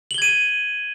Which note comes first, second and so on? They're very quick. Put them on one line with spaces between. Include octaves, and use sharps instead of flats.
F#7 G7 G#6 D#7